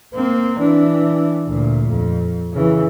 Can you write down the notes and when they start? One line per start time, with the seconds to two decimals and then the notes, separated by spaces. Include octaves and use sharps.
0.14 A#3 C4
0.60 E3 D4
1.48 D2 A#2
1.88 F2
2.53 C#3 E3